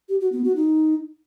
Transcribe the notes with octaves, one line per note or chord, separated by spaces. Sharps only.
G4
F#4
B3
F#4
D#4